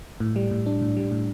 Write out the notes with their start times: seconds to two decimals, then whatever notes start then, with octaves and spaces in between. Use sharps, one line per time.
0.20 A2
0.36 G3
0.51 A2
0.66 D4
0.82 A2
0.97 G3
1.12 A2